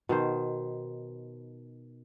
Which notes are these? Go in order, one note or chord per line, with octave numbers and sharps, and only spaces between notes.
B2 D#3 C5